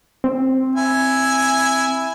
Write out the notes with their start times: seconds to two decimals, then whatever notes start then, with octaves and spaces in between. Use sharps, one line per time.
0.24 C4
0.76 E4 G#5